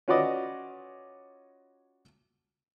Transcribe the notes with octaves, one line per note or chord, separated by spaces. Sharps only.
C#4 F4 F#4 B4 D5 D#5